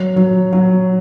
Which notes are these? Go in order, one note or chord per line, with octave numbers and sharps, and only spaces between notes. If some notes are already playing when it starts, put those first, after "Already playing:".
Already playing: F#3
F#3
F#3